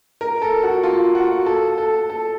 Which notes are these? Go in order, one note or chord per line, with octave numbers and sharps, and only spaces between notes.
A#4
A4
F#4
F4
F#4
A4
A4
A4